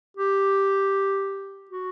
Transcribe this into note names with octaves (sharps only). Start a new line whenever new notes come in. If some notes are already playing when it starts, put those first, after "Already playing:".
G4
F#4